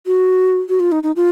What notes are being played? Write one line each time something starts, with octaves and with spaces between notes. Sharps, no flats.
F#4
F#4
F4
D#4
D#4
F4